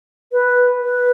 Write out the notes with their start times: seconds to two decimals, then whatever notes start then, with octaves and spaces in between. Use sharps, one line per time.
0.32 B4
0.82 B4